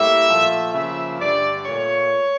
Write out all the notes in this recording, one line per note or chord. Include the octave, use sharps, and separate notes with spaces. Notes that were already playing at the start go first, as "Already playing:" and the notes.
Already playing: A2 G3 A#3 E5
A#2 F3 A3
C#3 F3 A#3 E5
G2 D3 A3 D5
A#2 A3 C#5